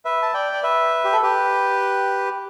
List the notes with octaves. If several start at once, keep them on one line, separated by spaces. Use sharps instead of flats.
B4 E5
A5
D5 G5
D5
B4 E5
G4
A4
G4 B4